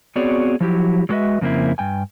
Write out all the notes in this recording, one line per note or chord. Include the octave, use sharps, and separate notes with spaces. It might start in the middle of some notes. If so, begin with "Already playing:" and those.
B3 C4 F#4 G#4 C#5 D5
F3 F#3 E4 G4
F#3 G#3 F#4 B4 D#5 E5
F2 C#3 A#3 C4 E4
G2 G5 G#5